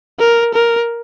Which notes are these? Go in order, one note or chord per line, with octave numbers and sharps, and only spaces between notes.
A#4
A#4